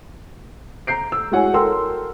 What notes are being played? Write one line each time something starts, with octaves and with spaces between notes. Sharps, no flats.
A#5 G6 C7 D7
E6
G#3 E4 F#4 C#5 F#5 G#5
A4 A#4 G5 C6 E6